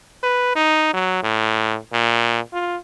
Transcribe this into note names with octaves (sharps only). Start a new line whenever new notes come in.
B4
D#4
F#3
A2
A#2
F4